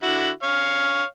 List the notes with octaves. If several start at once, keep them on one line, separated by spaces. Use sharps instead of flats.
D3 E4 F#4
C#5 F5